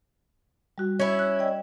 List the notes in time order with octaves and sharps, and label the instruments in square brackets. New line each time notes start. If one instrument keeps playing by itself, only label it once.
[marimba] G3 F#4
[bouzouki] C#4 E4
[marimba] F#6
D5 D#5 G5